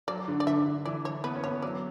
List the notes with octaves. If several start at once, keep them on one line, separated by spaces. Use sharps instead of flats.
F#3 D5
D3
D5
D3 E5
D3
E3 D5
C#5
B3 B4
C#4
B3 C#5
F#3 D5